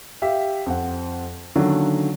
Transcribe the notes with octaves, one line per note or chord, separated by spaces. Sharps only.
G4 E5 F5 G5
F2 C4 F#5
D3 D#3 F#3 A#3 C#4 F#4